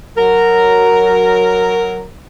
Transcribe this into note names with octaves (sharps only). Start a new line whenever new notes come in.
F#3 A#4